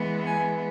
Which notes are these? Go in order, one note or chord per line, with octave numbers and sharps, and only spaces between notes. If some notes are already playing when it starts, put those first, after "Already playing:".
Already playing: E3 G#3 B3
G#5